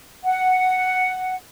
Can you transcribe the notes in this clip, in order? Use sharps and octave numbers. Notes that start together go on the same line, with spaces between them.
F#5